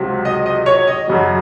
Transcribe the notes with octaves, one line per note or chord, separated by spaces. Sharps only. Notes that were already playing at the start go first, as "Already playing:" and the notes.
Already playing: C#2 C3 F#3
D#5
D#5
C#5
D#5
F#2 C#3 F#3